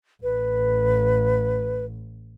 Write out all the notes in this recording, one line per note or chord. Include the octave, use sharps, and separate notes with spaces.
A1 B4